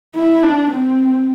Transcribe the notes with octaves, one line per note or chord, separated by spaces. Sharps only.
E4
D4
C4